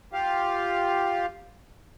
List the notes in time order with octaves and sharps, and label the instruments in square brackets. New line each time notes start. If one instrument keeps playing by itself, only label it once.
[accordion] F4 G4 F5